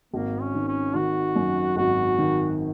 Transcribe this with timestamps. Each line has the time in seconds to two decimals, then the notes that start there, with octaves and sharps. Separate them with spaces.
0.14 G#1 A#3
0.41 C#4
0.55 D#3
0.68 C#4
0.95 D#3 F#4
1.36 F#2
1.77 G#1 F#4
2.18 D#3